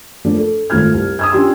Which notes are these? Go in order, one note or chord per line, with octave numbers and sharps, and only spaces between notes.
F3 A3 A#3 D4
A4
G#1 A3 F4 F6 G#6
C2
D#6 E6 G#6
C#4 D4 F4 G4 G5 C6